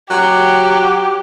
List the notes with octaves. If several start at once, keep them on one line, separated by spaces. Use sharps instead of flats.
F#3 G4